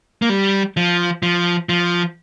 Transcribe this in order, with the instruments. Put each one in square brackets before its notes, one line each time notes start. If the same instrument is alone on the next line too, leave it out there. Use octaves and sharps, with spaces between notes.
[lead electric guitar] A#3
G3
F3
F3
F3